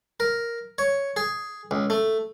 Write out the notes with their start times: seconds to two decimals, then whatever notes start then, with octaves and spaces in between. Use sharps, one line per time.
0.20 A#4
0.78 C#5
1.16 G#4
1.71 C#2
1.90 A3